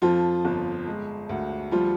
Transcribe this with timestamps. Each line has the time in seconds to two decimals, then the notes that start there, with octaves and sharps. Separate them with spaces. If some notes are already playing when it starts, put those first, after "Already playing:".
0.02 F2 F3 F4
0.45 G1
0.87 G#3
1.29 D2
1.71 F3 G3 F4